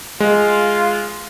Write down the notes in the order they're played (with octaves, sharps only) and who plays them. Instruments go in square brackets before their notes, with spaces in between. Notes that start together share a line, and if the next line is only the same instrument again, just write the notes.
[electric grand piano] G#3 [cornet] F4